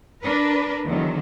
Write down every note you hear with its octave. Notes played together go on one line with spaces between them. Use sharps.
D4 A#4 B4
E2 D3 D#3 F#3